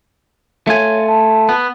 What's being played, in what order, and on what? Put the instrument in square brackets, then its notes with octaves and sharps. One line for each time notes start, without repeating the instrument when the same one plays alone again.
[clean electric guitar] A3 F4 G#5 [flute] C#5
[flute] A5
[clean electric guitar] B3